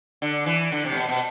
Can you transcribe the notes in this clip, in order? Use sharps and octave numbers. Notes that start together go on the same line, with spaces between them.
D3
E3
D3
C3
A2
B2
B2